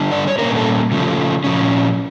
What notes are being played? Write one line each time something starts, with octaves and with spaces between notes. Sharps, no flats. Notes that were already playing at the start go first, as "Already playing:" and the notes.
Already playing: D3 G3 D4
D5
C#5
A#2 G3 A#3 C#4 A#4
A4
C#3 F3 A3
A#2 F3 C#4